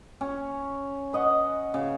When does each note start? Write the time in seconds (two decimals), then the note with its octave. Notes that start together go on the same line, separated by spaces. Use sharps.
0.21 C#4
1.13 B4 D#5 F#5
1.74 C#3